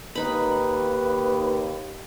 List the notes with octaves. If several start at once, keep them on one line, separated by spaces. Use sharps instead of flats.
D#2 D#4 B4 B5